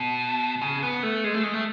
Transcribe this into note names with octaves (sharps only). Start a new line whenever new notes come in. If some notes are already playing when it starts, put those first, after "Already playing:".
Already playing: B2
C#3
B3
A3
G#3
A3
G#3
A3